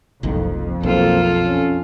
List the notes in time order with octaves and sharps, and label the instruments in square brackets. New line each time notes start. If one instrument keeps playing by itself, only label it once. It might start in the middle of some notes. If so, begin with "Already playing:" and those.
[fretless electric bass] F#1 C2 D#3 [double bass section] F2
[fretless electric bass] B1 [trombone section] A#3 C4 [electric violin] F4 A4
[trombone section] C#4